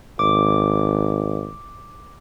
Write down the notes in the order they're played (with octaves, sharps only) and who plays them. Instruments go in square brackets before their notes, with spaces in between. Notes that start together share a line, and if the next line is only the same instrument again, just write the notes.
[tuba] G#1 [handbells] D6